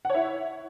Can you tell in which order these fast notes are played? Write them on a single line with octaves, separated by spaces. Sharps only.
F#5 C#5 E4